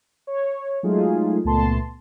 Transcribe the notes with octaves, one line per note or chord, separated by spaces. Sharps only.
C#5
F#3 G#3 A3 D#4 F4 G#4
C#2 A#2 A3 B3 A5 C6